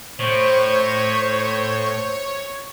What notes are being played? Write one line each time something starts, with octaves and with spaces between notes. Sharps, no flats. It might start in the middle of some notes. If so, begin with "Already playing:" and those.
A2 C5 C#5 C#6